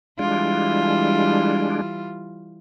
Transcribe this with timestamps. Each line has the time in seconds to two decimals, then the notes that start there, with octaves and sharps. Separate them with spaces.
0.19 E3 G3 G#3 D4 F4